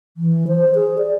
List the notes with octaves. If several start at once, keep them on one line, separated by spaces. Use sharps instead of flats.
E3
C5
G#4
D5